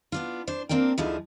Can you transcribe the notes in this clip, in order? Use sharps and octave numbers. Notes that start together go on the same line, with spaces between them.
B3 D4 F4
D4 C5
A#3 C4 D4 A#4 G5
D2 D3 F3 D#4 E4 G#4